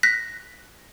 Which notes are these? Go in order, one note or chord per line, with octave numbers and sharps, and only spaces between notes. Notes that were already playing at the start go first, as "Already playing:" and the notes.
F#6 A#6 B6